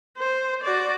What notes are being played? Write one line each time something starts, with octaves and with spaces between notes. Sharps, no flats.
C5
F#4 D5